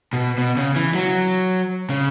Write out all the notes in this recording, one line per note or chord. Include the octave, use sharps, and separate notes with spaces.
B2
B2
C#3
E3
F#3
C#3